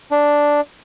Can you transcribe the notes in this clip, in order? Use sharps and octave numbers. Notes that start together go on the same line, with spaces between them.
D4